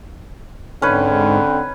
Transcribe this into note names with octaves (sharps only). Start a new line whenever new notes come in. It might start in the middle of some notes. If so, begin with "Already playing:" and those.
G#2 D3 C4 C#4 D#4 B4